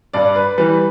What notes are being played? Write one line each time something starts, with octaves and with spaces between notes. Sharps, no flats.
G2 D5
B4
E3 G3 B4